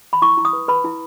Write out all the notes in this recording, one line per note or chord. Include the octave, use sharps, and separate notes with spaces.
B5
E4 C#6
E4
D#6
B4
B4 B5
E4